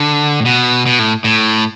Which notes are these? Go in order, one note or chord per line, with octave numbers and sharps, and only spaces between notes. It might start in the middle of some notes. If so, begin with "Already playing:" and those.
Already playing: D3
A2
B2
B2
A2
A2